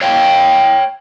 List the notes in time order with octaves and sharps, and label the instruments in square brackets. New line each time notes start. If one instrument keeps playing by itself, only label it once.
[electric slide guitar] C#5 F5 G5